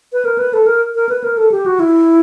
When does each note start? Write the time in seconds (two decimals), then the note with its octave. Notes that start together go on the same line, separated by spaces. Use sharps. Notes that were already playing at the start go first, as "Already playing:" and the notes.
0.13 B4
0.25 A#4
0.38 B4
0.53 A4
0.66 A#4
0.95 A#4
1.09 B4
1.24 A#4
1.37 A4
1.52 G4
1.66 F#4
1.80 E4